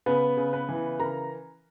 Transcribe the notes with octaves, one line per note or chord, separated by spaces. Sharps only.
C#3 B3 B4
C#3
B3 B4
E3
C#3 A#4 A#5